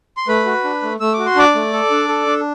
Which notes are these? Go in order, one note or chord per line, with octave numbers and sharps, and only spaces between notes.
C6
A3 B4 B5
F#4
D4
A3
A3 E6
F#4 D6
C6
D4 D5 D6
A3
A4
D4
A4
D4